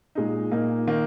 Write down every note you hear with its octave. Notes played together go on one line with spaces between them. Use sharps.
A#2 G#3 D#4
A#2 A#3 D#4
D#3 A#3 D#4